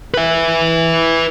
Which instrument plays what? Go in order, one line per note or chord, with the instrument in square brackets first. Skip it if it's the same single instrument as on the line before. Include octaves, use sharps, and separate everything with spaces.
[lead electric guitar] B4 E5